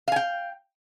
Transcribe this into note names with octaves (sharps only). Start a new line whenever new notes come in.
F5 G5 G#5